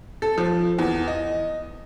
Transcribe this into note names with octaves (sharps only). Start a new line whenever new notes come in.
A4
F3
E2
D#5